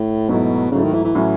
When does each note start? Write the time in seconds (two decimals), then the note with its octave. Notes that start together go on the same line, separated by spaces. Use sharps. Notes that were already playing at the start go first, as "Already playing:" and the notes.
Already playing: A2
0.29 G#2 B2 F#3 A3 E4
0.72 G#2 C#3 F#3 A3 E4
0.83 D#3
0.94 E3
1.04 E3
1.15 A2 F#3 C#4 F#4